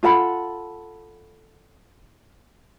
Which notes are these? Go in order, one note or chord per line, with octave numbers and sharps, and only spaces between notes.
F4 A4 F#5 B5